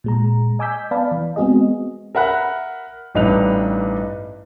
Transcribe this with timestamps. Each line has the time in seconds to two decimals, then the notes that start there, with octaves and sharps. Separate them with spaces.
0.04 A#2 G#3 A#5
0.59 D#5 G#5 D6 E6 G6 B6
0.91 B3 B4 D5 F5 A5 B5
1.12 E3
1.36 G#3 B3 C4 F#4 G#4 D#5
2.15 A#4 E5 F#5 B5 F#6
3.15 A1 G2 D#4 B4 F7